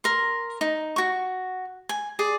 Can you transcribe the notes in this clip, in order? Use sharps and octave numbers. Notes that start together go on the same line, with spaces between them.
A#4 C6
D#4
F#4 C#6
G#5
G#4 D5